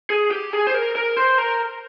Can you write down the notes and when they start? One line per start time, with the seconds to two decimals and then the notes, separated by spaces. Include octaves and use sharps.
0.10 G#4
0.31 G4
0.53 G#4
0.67 C5
0.74 A#4
0.95 A#4
1.17 C5
1.38 A#4